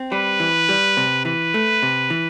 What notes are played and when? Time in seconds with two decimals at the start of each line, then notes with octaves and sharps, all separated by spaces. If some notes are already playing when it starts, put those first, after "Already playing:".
Already playing: C4
0.12 G3 B4
0.40 E3
0.69 G3
0.97 C3
1.25 E3 B4
1.54 A3
1.83 C3
2.10 E3